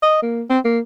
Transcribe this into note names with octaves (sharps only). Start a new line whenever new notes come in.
D#5
A#3
C4
A#3